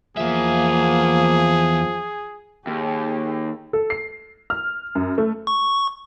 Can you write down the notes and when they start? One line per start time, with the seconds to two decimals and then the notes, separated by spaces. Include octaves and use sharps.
0.17 E2 F3 A#3 G#4 E5
2.67 D#2 G4 G#4
3.73 A4
3.90 C7
4.50 F6
4.95 F#2
5.18 A3
5.47 C#6